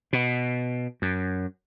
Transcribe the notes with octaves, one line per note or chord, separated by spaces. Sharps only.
B2
F#2